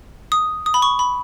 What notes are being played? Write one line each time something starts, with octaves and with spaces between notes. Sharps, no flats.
D#6
D#6
B5
C#6
B5